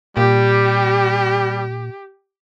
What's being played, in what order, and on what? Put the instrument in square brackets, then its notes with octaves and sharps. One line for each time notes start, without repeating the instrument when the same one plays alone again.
[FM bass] A#2 [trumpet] G3 [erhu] G4